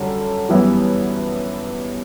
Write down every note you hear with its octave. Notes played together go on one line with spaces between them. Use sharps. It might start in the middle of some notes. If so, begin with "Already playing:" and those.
Already playing: F#2 D3 G3
F#2 E3 G3 B3 E4